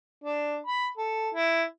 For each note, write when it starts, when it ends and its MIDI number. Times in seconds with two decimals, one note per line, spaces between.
0.24 0.58 62
0.67 0.88 83
0.98 1.29 69
1.35 1.63 64